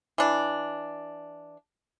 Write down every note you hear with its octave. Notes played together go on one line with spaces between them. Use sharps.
E3 D4